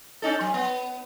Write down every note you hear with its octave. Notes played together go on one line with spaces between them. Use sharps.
C#4 D#4 A4
F#3
B3